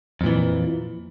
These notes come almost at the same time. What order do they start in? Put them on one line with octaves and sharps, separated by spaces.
F2 A#2 E3